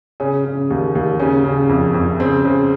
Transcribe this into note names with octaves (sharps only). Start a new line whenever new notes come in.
C#3 C#4
C#3
D#2
D#2
C#3 C#4
C#3
F2
F2
C#3 C4
C#3